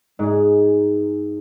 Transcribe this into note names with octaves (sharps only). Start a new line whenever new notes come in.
G#2 G#4